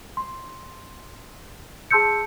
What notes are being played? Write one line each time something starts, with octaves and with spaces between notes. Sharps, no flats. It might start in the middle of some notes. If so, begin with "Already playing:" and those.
C6
G#4 A5 C6 E6 G6 C#7